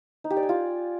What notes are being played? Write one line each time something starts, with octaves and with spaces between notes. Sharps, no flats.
D#4
G4
D5
G#5
F4